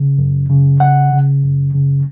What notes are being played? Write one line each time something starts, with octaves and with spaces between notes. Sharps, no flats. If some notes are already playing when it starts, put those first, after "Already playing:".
Already playing: C#3
F#2
C#3
C#3 F#5
C#3
F#2
C#3